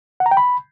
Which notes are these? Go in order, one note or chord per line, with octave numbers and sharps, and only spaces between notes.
F#5
A#5
G5
B5